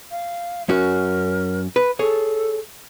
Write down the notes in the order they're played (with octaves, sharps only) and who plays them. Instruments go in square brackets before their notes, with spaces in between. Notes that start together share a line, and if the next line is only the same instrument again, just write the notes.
[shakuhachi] F5
[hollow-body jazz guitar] F#2 C#4 F#4 [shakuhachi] A#4
[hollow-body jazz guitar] B4
[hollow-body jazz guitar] G#4 C#5 [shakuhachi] A4